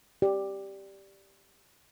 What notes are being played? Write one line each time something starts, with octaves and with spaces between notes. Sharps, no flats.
G4 D5